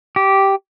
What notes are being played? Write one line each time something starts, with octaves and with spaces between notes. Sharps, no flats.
G4